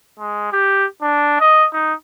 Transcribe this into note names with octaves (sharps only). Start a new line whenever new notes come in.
G#3
G4
D4
D#5
D#4